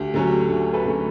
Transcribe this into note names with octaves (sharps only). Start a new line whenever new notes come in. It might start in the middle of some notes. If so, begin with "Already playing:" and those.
Already playing: D2 G4
D3 F#3 A3 C#4
G4
D2
A4 B4
D3 F#3 A3 C#4